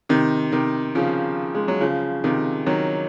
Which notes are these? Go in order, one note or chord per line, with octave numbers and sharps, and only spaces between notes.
C3 D#3
C3 D#3
C#3 F3
G#3
F#3
C#3 F3
C3 D#3
D#3 F#3